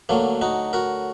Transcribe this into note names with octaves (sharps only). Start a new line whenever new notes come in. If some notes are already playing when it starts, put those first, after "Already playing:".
D2 D3 F#3 A#3
D#4 F#4
F#4 A#4